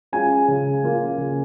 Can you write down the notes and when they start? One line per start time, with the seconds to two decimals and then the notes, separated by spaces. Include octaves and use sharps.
0.12 G#3 C#4 F4 G#5
0.48 C#3
0.84 A#3 F4
1.18 C#3